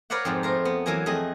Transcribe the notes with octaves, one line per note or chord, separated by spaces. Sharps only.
A#4 B4 C#5 D5 F5 F#5
F2 G#2 F3
A3 A#4 C5
B3
E3 F#3 A#3 A#4 G#5
F2 A3 G#4 D#5